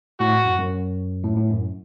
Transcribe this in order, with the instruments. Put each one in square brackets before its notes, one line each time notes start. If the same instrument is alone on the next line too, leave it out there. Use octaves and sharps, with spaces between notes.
[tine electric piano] A2 [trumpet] F#4
[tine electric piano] F#2
F#2
A2
A2
F#2